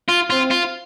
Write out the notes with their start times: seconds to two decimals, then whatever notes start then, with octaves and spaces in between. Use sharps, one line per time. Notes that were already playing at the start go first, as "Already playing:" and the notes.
0.09 F4
0.30 C4 F4
0.51 F4